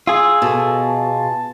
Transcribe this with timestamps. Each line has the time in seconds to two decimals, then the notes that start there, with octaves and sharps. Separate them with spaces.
0.07 F4 G#4 E6
0.42 B2 A4
0.83 A5